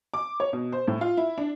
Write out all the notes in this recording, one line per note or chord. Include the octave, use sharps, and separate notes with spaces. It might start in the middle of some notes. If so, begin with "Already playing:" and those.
D6
C#5
B2
C5
A2
F4
E4
D4